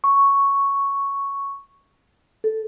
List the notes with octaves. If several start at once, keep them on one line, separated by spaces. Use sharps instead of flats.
C#6
A4